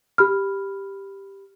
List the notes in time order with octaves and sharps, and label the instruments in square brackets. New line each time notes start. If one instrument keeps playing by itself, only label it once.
[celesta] G4 B5 F6